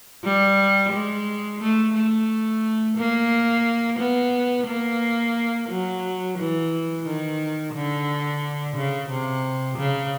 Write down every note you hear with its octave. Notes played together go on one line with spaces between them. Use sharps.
G3
G#3
A3
A3
A#3
B3
A#3
F#3
E3
D#3
D3
C#3
C3
C#3